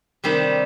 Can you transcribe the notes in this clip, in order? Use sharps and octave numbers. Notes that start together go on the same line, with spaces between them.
C3 D#3 G3 C4